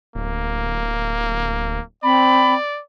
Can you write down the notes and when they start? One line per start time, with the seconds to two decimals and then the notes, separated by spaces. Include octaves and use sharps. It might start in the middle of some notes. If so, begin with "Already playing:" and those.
0.15 D1 A#3
2.03 C4 D5 B5